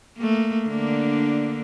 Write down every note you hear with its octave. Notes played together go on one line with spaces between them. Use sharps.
A3 A#3
D3 A#3 D4